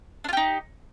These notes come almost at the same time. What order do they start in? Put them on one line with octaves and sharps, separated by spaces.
D4 F4 G4 D#4